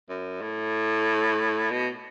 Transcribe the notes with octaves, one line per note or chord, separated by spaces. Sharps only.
F#2
A2
B2